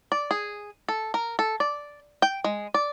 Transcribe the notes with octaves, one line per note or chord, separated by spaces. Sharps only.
D5
G#4
A4
A#4
A4
D5
G5
G#3
D5